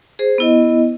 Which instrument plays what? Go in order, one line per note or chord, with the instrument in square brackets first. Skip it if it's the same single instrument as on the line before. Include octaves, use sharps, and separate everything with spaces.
[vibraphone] G#4 C5
B3 E4 D#5